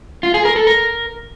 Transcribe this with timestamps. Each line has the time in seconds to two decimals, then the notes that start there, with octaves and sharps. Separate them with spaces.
0.23 F4
0.34 G#4
0.45 A#4
0.56 A4
0.67 A#4